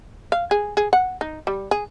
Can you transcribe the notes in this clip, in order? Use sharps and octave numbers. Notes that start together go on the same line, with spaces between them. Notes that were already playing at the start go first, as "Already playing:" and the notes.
F5
G#4
G#4
F#5
D#4
G3
G#4